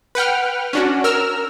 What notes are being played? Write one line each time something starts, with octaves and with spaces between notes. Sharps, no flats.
B4 F#5 G5 F6
C#4 D4 F#4
A#4 E6 F6